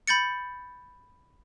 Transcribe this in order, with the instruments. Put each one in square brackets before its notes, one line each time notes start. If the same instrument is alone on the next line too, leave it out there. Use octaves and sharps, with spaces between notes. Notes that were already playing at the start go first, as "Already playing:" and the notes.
[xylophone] B5 G6 A6 C#7